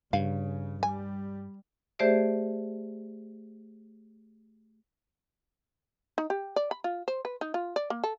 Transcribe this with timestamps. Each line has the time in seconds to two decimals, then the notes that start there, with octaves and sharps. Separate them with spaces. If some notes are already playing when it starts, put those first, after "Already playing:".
0.13 G2 C#3 F5
0.83 G3 G#5
1.99 A3 G4 G#4 C5 D5 E5
6.18 D#4
6.30 G4
6.56 D5
6.71 B5
6.84 F4
7.08 C5
7.25 B4
7.41 D#4
7.54 F4
7.76 D5
7.90 A#3
8.04 A4